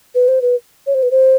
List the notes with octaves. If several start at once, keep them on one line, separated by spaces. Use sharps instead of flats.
B4
C5
B4
C#5
C5
B4
C5